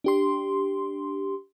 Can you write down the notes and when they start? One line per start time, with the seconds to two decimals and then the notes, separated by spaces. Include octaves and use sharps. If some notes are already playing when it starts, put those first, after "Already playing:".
0.04 D4 G4 C6